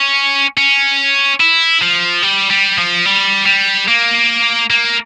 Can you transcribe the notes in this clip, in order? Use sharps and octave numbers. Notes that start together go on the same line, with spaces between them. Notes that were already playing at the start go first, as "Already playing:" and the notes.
Already playing: C#4
C#4
E4
F3
G3
G3
F3
G3
G3
A#3
A#3